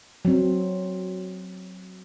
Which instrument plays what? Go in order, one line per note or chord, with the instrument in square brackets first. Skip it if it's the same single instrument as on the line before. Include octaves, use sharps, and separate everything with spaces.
[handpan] F#3 C4